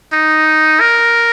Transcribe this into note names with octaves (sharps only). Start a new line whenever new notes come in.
D#4
A#4